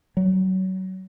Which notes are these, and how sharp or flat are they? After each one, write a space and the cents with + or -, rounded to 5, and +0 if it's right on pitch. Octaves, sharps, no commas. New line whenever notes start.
F#3 +25